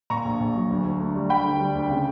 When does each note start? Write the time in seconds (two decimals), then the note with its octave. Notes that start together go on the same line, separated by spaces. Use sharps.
0.10 A#2 A#5 C#6
0.25 A#1
0.40 A#1
0.55 F#3
0.70 D2
0.85 D2
1.00 D2
1.15 G3
1.30 D2 G5 B5
1.45 D3
1.60 G3
1.75 D2
1.90 C#3